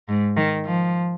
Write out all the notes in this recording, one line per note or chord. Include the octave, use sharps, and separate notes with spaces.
G#2
D#3
F3